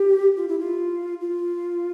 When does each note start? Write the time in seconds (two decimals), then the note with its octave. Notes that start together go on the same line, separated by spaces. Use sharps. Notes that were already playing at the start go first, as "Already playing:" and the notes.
Already playing: G4
0.36 F4
0.48 E4
0.59 F4
1.20 F4